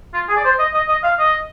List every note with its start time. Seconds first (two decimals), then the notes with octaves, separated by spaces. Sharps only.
0.14 F4
0.29 G#4
0.37 D5
0.45 C5
0.59 D#5
0.74 D#5
0.89 D#5
1.04 F5
1.19 D#5